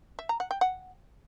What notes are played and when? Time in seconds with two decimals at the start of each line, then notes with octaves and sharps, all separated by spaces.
0.19 E5
0.29 A#5
0.40 F#5
0.51 G5
0.61 F#5